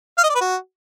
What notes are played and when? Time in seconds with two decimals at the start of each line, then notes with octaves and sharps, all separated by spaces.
0.18 F5
0.24 D#5
0.29 D5
0.35 B4
0.41 F#4